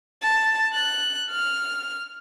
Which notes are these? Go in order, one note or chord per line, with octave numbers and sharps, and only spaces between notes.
A5
F#6
F6